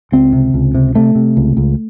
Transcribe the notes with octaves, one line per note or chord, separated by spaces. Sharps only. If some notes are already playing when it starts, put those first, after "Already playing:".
C#2 C4
C3
C#2
C3
C3 A3
C3
C#2
C#2